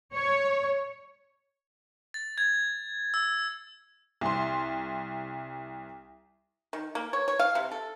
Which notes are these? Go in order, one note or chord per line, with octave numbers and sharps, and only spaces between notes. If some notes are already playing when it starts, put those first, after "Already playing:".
C#5
A6
G#6
E6
C2 C6
D#3
A#3
C#5
C#5
F5
C3
A4